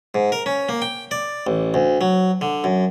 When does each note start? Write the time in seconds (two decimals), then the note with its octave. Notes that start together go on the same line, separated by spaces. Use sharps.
0.15 G#2
0.32 A#4
0.46 C#4
0.69 A#3
0.82 G5
1.11 D5
1.47 A1
1.74 D2
2.01 F#3
2.41 D3
2.64 F#2